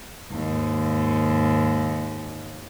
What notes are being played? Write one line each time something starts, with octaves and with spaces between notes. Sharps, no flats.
D#2 G#2